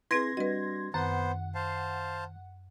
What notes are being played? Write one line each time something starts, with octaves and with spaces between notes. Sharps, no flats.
C4 E4 G#4 B4 C6 G#6 A#6
G3 D4 F#4 B4 D#5
F#2 D#3 B3 C5 F#5
C5 F5 A5